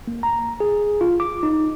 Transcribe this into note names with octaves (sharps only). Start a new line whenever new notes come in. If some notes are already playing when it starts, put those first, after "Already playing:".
A#3
A#5
G#4
F4
D6
D#4